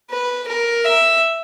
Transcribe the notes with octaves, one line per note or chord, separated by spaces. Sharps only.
B4
A#4
E5